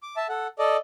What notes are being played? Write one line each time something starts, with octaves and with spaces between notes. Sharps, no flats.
D6
E5 A5
A4 F#5
A4 D5 D#5